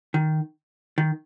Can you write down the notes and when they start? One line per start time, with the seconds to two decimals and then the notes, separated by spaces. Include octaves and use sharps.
0.14 D#3
0.98 D#3